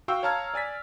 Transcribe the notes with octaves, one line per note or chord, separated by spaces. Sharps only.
F#4 F5 G5 C#6 E6
C#5 F5 A5 A#5 F6 G#6
D5 G#5 A6 B6